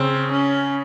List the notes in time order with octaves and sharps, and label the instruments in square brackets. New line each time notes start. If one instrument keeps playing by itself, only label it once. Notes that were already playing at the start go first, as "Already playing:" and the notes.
Already playing: [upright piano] C#3 [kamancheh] C4
[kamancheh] C#4